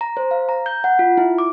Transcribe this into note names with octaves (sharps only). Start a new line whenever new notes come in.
A#5
C5
F5
A#5
G6
F#5
F4
E4
D6